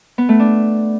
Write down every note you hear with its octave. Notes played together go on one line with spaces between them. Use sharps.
B3
A3
D4